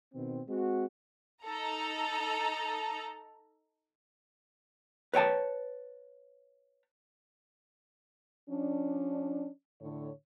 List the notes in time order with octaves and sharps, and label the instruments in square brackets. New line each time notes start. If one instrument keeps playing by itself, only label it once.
[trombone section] B2 D#3 C4
G#3 C4 F#4
[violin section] D#4 A4 A#5
[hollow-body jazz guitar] B4 C#5 G5 A5
[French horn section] F3 C#4 D4
A2 D3 C#5